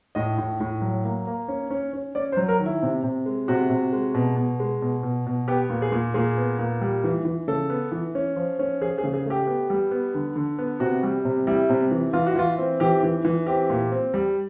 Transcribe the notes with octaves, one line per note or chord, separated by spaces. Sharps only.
A2 D#5
A2
A2
F#3
A#3
A#3
C#4
C#4
C#4
C#4 D5
C5
F#3
A#4
D#3
E4
C3
C3
G#3
C3 F#4
C3
G#3
B2
B2
G#3
B2
B2
B2
B3 G4
A#2
G#4
A#2
A#2 G#4
B3
A#2
G3
E3
E3
C#3 A4
B3
E3
C#4
F3
C#4
F3 G#4
G#4
C#3
G#4
A3 G4
B3
G3
B3
D3
D3
B3
C3 F#4
G3
C3
G3 E4
C3
E3
E3 F4
F#4
E3 F4
C4
E3 G4
E3
E3
C4 G4
A#2
C4
G3